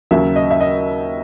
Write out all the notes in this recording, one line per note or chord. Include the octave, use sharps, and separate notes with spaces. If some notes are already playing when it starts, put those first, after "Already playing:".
D#2 C#3 F#3 E5
D#5
E5
D#5